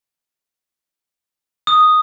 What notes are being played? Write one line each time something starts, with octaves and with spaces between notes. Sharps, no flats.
D#6